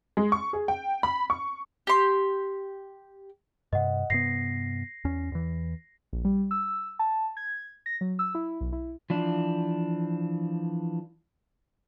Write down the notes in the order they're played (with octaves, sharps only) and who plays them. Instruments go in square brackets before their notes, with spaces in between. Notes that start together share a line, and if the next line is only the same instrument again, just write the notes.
[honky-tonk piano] G#3
C#6
G#4
G5
B5
C#6
[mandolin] G4 C6
[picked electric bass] G2 C3 [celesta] D#5 F#5
[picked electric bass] G2 C3 B3 [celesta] A#6 C7
[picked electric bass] E2 C#4
E2 E3
[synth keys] A#1
G3
E6
A5
G#6
A#6
F#3
E6
E4
B1
E4
[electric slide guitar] E3 F3 D4